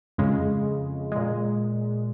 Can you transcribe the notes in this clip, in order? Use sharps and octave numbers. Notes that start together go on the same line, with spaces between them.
F2 C#3 G#3
A#2 G#3